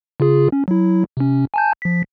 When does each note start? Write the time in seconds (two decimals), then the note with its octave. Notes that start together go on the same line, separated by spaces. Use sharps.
0.20 C#3 F4 G#4
0.52 C#4
0.68 F#3 E4
1.17 C3 C#4
1.54 G#5 A5 G6
1.82 F3 B6